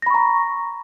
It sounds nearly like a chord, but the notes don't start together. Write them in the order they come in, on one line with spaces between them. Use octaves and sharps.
A#6 B5 C#6 A#5